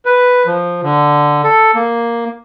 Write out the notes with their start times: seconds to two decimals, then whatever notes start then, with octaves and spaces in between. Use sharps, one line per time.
0.06 B4
0.47 F3
0.83 D3
1.44 A4
1.75 A#3